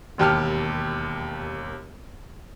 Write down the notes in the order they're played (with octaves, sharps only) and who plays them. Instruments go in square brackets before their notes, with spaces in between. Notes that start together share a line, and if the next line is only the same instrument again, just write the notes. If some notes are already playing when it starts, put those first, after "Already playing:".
[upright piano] E1 D#2 G4 A5 F6